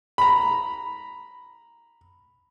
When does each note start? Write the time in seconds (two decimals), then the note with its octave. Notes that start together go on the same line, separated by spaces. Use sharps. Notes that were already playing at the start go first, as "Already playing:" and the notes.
0.18 A#5 B5